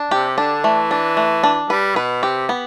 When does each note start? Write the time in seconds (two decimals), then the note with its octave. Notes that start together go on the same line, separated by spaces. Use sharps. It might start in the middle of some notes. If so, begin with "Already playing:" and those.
Already playing: D4
0.11 C3 G4
0.38 D3 D4
0.64 E3 A3
0.91 D4
1.17 A3
1.43 D4
1.70 G3 B4
1.96 B2 B4
2.23 C3 G4
2.49 B3